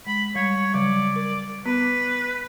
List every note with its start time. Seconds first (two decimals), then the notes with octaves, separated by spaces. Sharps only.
0.07 G#3 B5
0.36 G3 C#5
0.74 C#3 F#3 G3 D5
1.16 A#4
1.66 B3 B4